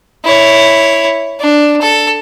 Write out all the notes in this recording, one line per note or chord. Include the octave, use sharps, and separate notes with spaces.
E4 C#5
D4
A4